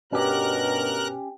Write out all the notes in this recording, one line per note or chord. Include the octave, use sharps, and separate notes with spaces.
G2 B2 C#4 G4 A#4 A#5 F#6